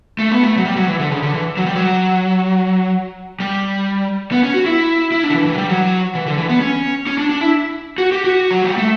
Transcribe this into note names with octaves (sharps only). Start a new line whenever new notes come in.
A3
B3
A3
F#3
G3
F#3
E3
D3
C#3
D3
E3
F#3
G3
F#3
G3
B3
C#4
F#4
E4
E4
D4
D3
E3
E3
F#3
G3
F#3
E3
D3
E3
B3
C#4
C#4
D4
D4
E4
F#4
G4
F#4
F#3
G3
A3